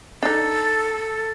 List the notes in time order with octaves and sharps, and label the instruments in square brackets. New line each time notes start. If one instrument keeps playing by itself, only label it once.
[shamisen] D4 D#4 [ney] A4 [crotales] A6